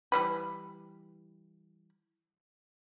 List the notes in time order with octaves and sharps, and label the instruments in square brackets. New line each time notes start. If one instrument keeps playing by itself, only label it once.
[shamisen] E3 G3 B4